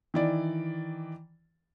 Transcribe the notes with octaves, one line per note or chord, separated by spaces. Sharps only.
D#3 E3 D5